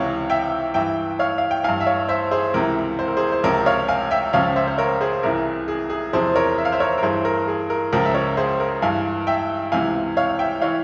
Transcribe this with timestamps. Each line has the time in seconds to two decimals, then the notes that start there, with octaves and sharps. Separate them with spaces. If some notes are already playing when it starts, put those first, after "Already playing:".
Already playing: C#2 C3 E3 C#5 F5
0.30 E5 G5
0.74 G2 E3 E5 G5
1.19 C#5 F5
1.38 F5
1.51 G5
1.64 G2 E3 F5 G#5
1.80 E5
1.87 C#5 F5
2.09 C5 E5
2.31 G#4 C5
2.54 C#2 C3 E3 A#4
2.99 C5
3.07 A#4
3.17 G#4 C5
3.32 C5
3.44 C#2 C3 F3 A#4 C#5
3.66 C#5 F5
3.88 F5 G#5
4.11 E5 G5
4.33 C#2 C#3 F3 C#5 F5
4.56 C5 E5
4.68 C5
4.78 A#4 C#5
5.01 G#4 C5
5.23 C2 C3 E3 A#4
5.68 G#4
5.90 G#4
6.13 E2 C3 F3 G#4 C5
6.35 A#4 C#5
6.58 E5
6.65 F5
6.72 C5 E5
6.80 A#4 C#5
6.98 A#4
7.03 G2 E3 G#4 C5
7.25 A#4
7.48 G#4
7.70 A#4
7.93 C#2 C#3 F3 A#4
8.05 E5
8.14 A#4 C#5
8.37 G#4 C5
8.60 A#4
8.82 G2 E3 F5 G#5
9.27 E5 G5
9.72 C#2 C3 E3 F5 G#5
10.17 C#5 F5
10.39 E5 G5
10.62 E3 C#5 F5